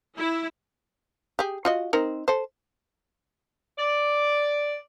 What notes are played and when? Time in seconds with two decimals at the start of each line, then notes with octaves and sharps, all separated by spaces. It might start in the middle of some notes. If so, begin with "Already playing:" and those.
0.18 E4
1.39 G4 G#4
1.65 F4 F#4 D#5
1.93 C4 D#4 A#4
2.28 A4 C5
3.78 D5